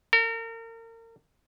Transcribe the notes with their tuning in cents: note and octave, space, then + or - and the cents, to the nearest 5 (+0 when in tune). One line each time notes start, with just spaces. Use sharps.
A#4 -35